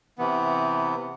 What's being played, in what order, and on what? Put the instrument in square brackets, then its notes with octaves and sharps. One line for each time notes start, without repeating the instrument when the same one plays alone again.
[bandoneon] C3 E3 B3